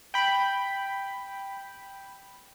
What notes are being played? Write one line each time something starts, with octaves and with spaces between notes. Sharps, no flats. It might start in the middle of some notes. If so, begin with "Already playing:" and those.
G5 B5